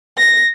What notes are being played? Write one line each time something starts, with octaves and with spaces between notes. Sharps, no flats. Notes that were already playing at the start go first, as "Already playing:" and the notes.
A#6